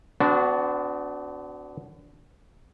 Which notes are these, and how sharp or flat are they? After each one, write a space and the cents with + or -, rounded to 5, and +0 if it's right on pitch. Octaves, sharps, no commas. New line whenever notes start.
B3 +40 D4 -15 F#4 +0